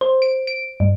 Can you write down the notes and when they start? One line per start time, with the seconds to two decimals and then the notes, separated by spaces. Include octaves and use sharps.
0.01 C5
0.22 D7
0.47 D7
0.80 G2